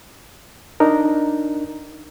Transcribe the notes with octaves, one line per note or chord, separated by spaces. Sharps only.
D4 D#4 A#4